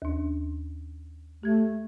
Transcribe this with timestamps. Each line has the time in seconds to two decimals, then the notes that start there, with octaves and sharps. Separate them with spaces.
0.02 D#2 D4
1.43 A3 G4 G#6